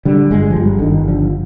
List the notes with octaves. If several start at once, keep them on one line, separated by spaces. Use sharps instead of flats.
D3 G3
G1 G#3
F3
G1 G3
D3
G1 D#3
D3 F3